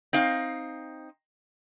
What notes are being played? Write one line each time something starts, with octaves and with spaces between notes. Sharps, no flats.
C4 D#4 F5